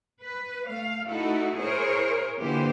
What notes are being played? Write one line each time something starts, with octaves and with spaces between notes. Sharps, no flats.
B4
A3 F5
A3 D#4 E4 F#4 A4
E4 G#4 A#4 C5 C#5
D3 E3 F3 A#3 G4 C5